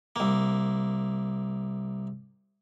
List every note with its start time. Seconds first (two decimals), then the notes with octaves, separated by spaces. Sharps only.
0.16 C2 A#3